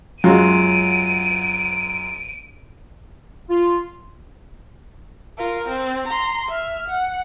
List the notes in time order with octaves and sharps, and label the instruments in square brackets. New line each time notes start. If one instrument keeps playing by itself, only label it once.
[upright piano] F#2 F#3 G#3 [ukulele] F4 F#4 [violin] D7 D#7
[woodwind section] F4
[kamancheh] F4 A#4
C4
A#5 C6
E5 F6
F#5